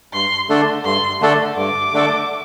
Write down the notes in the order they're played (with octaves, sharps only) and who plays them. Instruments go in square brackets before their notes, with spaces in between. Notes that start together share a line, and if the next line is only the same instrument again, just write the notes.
[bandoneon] G2 [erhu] C6
[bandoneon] D3 A3 D4 A4
[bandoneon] G2 [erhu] C6
[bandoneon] D3 A3 D4 A4
[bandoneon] G2 [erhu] D6
[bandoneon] D3 A3 D4 A4